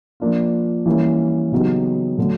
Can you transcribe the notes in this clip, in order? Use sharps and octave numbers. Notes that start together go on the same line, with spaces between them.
F3 A#3 D4 F4
E3 G3 A#3 C#4
C#3 F#3 B3 D#4 G4
D3 F#3 A3 D4